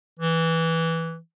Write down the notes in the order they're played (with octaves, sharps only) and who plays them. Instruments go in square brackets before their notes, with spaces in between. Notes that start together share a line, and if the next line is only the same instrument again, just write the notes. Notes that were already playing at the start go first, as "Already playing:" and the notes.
[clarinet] E3